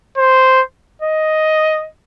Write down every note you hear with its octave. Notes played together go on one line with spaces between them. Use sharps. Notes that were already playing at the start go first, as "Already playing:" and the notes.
C5
D#5